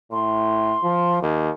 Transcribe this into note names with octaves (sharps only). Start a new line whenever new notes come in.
A2 C6
F3
D#2 A#4